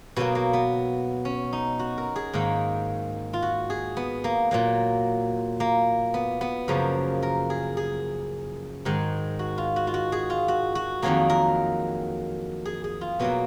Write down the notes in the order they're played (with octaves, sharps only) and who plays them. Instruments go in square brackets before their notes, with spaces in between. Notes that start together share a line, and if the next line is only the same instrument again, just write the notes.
[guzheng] B2 F#3 A#3 B3
A#3
B3
C#4
D#4
F#4
A#4
G#4
G#2 D#3 A#3
F4
F#4
G#4
B3
A#3
A#2 F#3 A#3
A#3
B3
B3
F#2 C#3 F3 A#3
A#4
G#4
G#4
G#2 D#3 G#3
F#4
F4
F#4
F4
F#4
G#4
F4
F#4
F#4
F2 D#3 F#3 A#3 G#4
A#4
G#4
G#4
F4
B2 F#3 A#3 B3